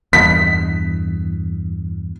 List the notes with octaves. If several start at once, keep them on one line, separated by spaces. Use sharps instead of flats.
E2 G2 B6